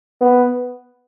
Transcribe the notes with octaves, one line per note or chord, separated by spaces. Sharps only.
B3